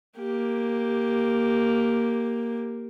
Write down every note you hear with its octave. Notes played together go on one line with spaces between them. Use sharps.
A#3 G4